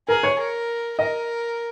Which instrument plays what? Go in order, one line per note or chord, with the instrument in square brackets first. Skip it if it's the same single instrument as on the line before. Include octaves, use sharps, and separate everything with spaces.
[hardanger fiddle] G#4 [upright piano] A#4
[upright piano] C#5
[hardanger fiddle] A#4
[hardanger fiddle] A#4 [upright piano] D#5